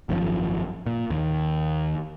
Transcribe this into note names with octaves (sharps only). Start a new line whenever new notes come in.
G#1 F#2 B2 F3
A#2
D#2